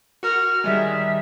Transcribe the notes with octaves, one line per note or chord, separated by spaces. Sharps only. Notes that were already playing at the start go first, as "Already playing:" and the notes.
F#4 A#4 F6
D#3 G3 G#3 E5